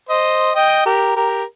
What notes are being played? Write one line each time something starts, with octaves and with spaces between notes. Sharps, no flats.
C5 D#5
D#5 G5
G4 A#4
G4 A#4